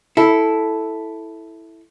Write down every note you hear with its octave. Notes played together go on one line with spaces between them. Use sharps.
E4 A4